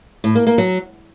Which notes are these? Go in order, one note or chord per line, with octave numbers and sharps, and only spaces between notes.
A2
A#3
A#3
F#3